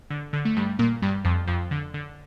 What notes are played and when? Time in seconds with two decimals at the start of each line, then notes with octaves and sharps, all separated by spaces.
0.10 D3
0.33 D3
0.45 A3
0.56 G2 G3
0.79 A#2 A#3
1.02 G2 G3
1.24 F2 F3
1.47 F2 F3
1.71 D3
1.94 D3